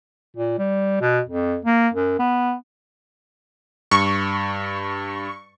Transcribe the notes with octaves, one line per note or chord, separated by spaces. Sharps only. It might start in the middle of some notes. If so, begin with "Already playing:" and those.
A#2
G3
B2
F2
A#3
F#2
B3
G2 C#6